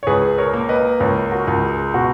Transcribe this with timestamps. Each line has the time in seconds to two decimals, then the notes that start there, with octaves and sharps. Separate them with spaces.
0.03 C#5
0.07 C#2 G#4 B4
0.38 A#4 C#5
0.54 A#3
0.69 B4 D#5
1.00 C#2 A#4 C#5
1.32 F#4 A#4
1.47 C#2
1.63 G#4
1.94 B2 F#4